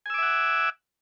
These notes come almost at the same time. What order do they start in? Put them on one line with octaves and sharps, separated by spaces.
G#5 E6 D6 E5 F#5